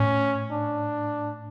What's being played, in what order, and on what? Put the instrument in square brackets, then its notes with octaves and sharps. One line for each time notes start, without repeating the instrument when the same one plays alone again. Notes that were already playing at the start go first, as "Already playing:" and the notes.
Already playing: [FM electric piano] A2 [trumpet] C#4
[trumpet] D4